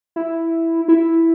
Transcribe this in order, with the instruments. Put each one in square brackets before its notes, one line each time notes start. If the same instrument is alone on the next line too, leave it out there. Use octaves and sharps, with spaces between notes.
[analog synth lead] E4
E4